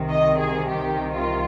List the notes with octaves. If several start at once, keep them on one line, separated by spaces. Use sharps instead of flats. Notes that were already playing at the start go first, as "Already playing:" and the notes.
Already playing: C2 C3 D#3
D#5
G#4
G4
F4